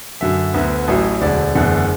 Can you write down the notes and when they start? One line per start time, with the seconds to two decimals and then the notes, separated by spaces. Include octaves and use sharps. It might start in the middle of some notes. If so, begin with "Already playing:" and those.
0.21 F#2 D3 F#3 E5
0.54 D2 D3 B3
0.88 A1 A2 F#3 A3
1.21 E1 D2 D3 D5
1.55 F#1 E2 D3 A3